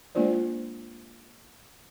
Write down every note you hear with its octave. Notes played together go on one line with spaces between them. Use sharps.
G#3 A#3 D4 F4 C5 D5